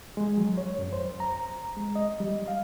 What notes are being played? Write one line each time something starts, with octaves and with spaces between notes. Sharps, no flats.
G#3
F#3
C#5
F#2
C5
A#5
G#3
D#5
G3
F5